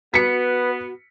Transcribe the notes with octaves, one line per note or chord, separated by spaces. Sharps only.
B3 F#4 B4 B6 C#7